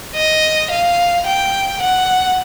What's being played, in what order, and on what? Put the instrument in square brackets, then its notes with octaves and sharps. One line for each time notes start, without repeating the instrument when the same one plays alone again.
[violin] D#5
F5
G5
F#5